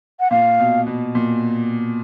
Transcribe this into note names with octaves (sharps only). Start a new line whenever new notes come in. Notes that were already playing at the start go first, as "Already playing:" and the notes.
F#5
A#2 F5
B2
B2
A#2